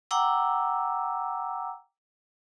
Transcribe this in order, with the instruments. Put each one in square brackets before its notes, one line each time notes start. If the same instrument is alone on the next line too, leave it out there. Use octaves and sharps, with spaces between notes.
[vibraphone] F#5 G5 A#5 D6 E6